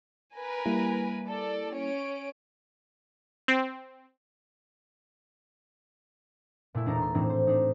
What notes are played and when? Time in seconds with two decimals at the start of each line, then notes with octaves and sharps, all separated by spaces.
0.35 A#4 B4 G#5
0.65 G3 A#3 E4
1.27 A4 D5
1.75 C#4 C#5 D7
3.48 C4
6.74 A#2 A3 E4
6.86 E1 D4 D#4 A#4 A#5 A6
7.02 C6
7.14 A2 E3 C4 D4 D#4
7.30 C5
7.47 D4 D#4